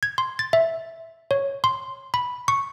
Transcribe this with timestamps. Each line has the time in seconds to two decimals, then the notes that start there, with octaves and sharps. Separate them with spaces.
0.03 G#6
0.18 C6
0.39 A6
0.53 E5
1.31 C#5
1.64 C6
2.14 B5
2.48 C#6